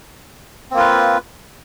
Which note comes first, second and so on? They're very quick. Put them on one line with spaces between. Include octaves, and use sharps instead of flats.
C4 A#3 F4 B4